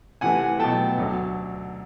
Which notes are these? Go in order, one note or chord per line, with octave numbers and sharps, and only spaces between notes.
C3 E3 A3 F#5 G#5
B2 F#3 A3 G5 A5
D2 D3 F#3